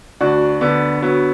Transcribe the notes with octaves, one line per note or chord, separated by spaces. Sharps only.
D2 D4 F#4
D3 B3 D4
F#3 B3